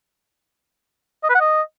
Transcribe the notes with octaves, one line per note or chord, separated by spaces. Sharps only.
D#5
B4
F#5
D#5